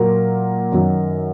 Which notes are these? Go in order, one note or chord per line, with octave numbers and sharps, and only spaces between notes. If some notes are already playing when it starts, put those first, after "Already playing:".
Already playing: A#2 F#3 A#3 A#4
F#2 D#3 F#3